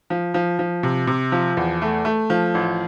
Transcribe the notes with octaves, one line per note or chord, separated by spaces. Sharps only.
F3
F3
F3
C3
C3
F3
E2
A3
A3
F3
A1